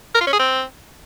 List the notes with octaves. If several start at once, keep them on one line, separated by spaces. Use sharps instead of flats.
A#4
F4
C#4
G#4
C4